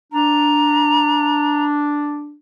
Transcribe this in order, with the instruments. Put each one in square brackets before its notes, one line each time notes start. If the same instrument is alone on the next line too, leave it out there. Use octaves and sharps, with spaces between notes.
[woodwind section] D4 [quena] A#5